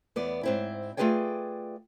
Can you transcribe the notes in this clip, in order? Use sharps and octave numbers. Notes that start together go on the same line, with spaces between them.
E2 B3 D5
G#2 C4 E4
A3 F4 G#4 B4 D5 G5